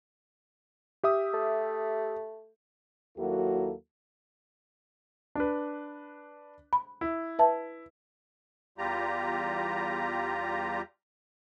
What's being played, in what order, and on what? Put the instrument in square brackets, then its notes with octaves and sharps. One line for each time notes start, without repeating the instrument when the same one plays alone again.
[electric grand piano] G4 E5 D#6
[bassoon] A3
[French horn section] D#2 F#3 A#3 E4 F#4 A4
[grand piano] D4 B4
[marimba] B5
[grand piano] E4
[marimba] B4 E5 A5
[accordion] E2 G3 F4 G4 A#5